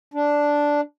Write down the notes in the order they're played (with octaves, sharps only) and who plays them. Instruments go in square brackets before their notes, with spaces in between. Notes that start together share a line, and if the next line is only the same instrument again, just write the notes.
[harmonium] D4